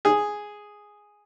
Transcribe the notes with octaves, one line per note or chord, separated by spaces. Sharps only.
G#4